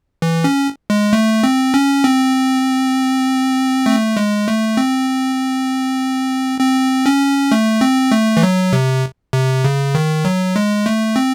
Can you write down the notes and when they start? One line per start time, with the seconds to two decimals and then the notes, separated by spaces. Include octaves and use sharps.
0.22 E3
0.44 C#4
0.90 G#3
1.13 A3
1.43 C4
1.74 C#4
2.04 C4
3.86 A3
4.17 G#3
4.48 A3
4.77 C4
6.60 C4
7.06 C#4
7.52 A3
7.81 C4
8.12 A3
8.37 E3
8.43 F#3
8.73 C3
9.33 C3
9.64 C#3
9.95 D#3
10.25 F#3
10.56 G#3
10.86 A3
11.16 C4